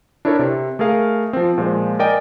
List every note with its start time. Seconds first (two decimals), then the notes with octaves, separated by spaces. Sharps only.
0.25 D4 E4 A4 A#4 C#5
0.39 C3
0.79 A3 G#4 A#4 F5
1.33 F3 C4
1.58 A#2 F3 G#3 C5
1.99 A#4 D5 D#5 G5 G#5